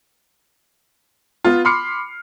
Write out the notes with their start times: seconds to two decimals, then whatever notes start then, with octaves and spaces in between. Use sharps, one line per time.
1.45 B3 F4
1.65 B5 C6 D6 F6 C7 C#7